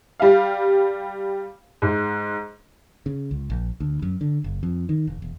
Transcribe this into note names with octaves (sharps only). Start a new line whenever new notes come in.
G3 F5
G#2
C#3
C#2
A#1
D2
F#2
D3
F#1
F2
D#3
E1
E1